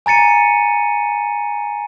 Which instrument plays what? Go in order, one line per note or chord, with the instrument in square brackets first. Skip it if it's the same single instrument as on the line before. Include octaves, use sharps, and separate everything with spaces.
[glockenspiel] G#5 A#5 A6 C#7 D#7